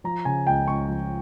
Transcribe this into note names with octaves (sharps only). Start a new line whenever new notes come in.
F3 A#5
C#3 G#5
C#2 G5
C#2 C#6
F3